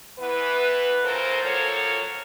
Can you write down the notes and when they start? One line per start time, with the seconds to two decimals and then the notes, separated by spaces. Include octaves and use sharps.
0.19 E3 B3 B4
1.03 A#2 C#3 A4 A#4 C5
1.43 F3 F#3 A#3 A4 C#5